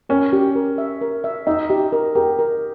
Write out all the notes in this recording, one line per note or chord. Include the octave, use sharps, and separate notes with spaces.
C#4 A#4
G4
A#4
E5
A#4
E5
D#4 E5
G4
A#4
G4 A#4
A#4